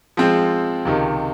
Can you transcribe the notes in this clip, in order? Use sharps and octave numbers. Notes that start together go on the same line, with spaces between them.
F3 G#3 C4
C#2 C3 D#3